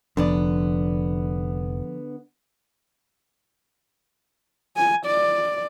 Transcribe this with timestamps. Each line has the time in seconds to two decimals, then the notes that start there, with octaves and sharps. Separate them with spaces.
0.17 F1 D3 F3 B3 D4 D5
4.77 G#5
5.06 D5